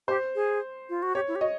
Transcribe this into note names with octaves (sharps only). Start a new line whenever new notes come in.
G4 C5
G#4
F4
F#4
G4 C#5
E4
G4
F#4 D#5